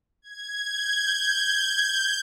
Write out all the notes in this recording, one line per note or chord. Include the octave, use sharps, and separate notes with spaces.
G#6
G6
G6